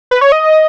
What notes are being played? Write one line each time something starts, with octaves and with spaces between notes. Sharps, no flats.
B4
C#5
D#5